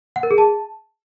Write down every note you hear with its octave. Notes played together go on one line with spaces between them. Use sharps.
F#5
A#4
G#4
A5